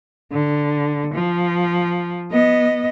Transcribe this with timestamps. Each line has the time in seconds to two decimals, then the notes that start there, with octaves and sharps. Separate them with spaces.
0.32 D3
1.14 F3
2.31 B3 D#5